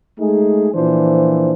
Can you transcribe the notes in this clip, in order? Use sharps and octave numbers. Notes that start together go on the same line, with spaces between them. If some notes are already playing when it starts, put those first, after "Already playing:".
G#3 A3 D#4 G#4
A#2 E3 F3 D4 C5